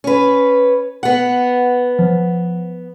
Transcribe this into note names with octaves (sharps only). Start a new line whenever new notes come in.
C#4 B4
B3 F#5
F3